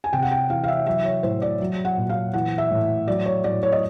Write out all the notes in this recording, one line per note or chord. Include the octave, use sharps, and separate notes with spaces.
G#5
C3 G5
F#5
G5
E3 F5
F5
E5
F#3 E5
C#5
A2 C5
D5
F#3
F#5
A#2
F5
E3 F#5
E5
A2
F#3 D5
C#5
A2 D5
C#5
D#5